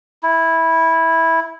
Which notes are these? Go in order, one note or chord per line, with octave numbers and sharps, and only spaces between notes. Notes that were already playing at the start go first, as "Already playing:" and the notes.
E4